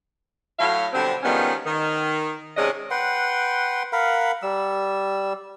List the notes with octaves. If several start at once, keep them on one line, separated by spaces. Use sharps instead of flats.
A2 F#3 F5
B2 D3 F#3 G3 C4
D#3 F3 G3 G#3 B3 C#4
D#3
G#2 C3 G#3 C#4 D4 D#5
B4 F#5 G5 C6
A#4 F5 F#5 B5
G3 E6